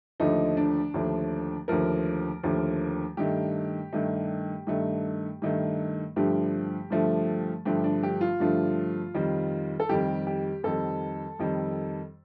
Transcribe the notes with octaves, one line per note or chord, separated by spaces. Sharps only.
D#2 D3 F3 A3 D#4
D4
D#2 D3 F3 A3
D#2 D3 F3 A3 A#4
D#2 D3 F3 A3
G2 D#3 A3 G4
G2 D#3 A3
G2 D#3 A3
G2 D#3 A3
G2 D3 F3 A3 G4
G2 D3 F3 A3
G2 D3 F3 A3 G4
D4
G4
F4
G2 D3 F3 A3
F2 D#3 G3
A4
F2 D#3 G3 G4
G4
F2 D#3 G3 A4
F2 D#3 G3